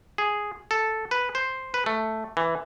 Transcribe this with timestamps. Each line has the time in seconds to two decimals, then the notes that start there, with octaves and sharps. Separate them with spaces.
0.18 G#4
0.71 A4
1.11 B4
1.35 C5
1.74 B4
1.86 A3
2.37 E3